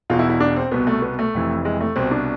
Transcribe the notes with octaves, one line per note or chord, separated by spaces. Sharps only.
E1 E2 B2 F4
E4
E4
D4
C4
C2 B2 B3
A3
B3
A3
F1 F2 E3
G#3
A3
C2 B2 C4
D4